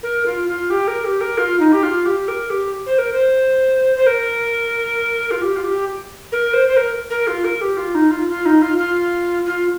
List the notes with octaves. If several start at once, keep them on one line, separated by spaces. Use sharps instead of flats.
A#4
F4
F4
G4
A#4
G4
A#4
F4
D#4
G4
F4
G4
A#4
G4
C5
A#4
C5
C5
A#4
F4
G4
F4
G4
A#4
C5
C5
A#4
A#4
F4
A#4
G4
F4
D#4
F4
F4
D#4
F4
F4
F4